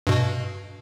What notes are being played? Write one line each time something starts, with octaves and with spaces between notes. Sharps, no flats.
G2 B2